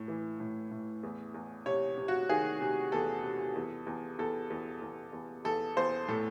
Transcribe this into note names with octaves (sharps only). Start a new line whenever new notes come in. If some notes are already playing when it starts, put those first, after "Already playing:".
Already playing: A2
E3
A2
A2
E2
E2
C3 C#5
C3
F#4
D#3 G#4
C3
E2 A4
C3
E2
E2
E2 A4
E2
E2
E2
E2 A4
E2 C5
A2 A4